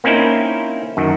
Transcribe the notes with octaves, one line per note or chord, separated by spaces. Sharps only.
A#3 C4 C#4 D#4 E4 G5
F#2 D#3